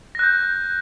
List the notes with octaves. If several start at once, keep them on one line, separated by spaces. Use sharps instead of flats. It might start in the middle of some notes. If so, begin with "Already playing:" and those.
F#6 G6 A#6